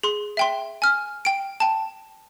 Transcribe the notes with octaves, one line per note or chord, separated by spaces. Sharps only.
G#4 C6
E5 G5 C6
G#5 F6
G5 D7
G5 A5